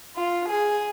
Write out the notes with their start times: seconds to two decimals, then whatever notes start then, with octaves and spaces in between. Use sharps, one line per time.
0.15 F4
0.47 G#4